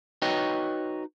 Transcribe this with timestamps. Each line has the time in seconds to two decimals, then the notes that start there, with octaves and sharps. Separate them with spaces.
0.22 D#4 F#4 B4 C#5 D#5 G5